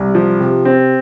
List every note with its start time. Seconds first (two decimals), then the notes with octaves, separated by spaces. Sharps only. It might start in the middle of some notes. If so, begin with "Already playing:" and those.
Already playing: C2
0.15 F3
0.40 C3
0.65 C4